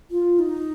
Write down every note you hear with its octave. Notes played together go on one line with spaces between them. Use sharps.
F4
D#4